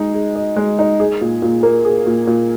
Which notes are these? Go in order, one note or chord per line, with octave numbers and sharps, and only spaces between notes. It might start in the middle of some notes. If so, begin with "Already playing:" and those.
Already playing: G#3 D#4
G#4
D#5
G#3
D#4
G#4
A#2
A#2
A#3
G#4
A#2
A#2